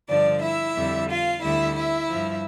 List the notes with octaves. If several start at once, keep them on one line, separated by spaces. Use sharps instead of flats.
G2 D3 F3 D4 D5
E4 E5
F2 D3 G3
F4 F5
D2 D3 G3 E4 E5
E4 E5
G2 F3